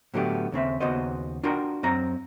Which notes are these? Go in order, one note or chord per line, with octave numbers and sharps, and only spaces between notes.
A2 D3 F#3 A3 B3 G4
D#2 C#3 C4 E5
D#2 C#3 B3 F#4 C5 D#5
D4 F4 F#4 A#4 G5 A#5
F#2 C4 A#5